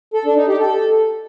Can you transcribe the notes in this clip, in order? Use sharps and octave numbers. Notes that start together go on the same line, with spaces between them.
A4
D4
D#4
G4
A4